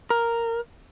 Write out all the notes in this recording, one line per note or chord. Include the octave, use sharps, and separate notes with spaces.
A#4